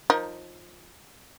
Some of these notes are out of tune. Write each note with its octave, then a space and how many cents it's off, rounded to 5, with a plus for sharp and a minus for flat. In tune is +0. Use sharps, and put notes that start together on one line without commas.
F3 +15 D#4 +0 A#4 +15